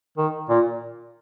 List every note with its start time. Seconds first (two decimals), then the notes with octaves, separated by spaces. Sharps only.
0.17 D#3
0.49 A#2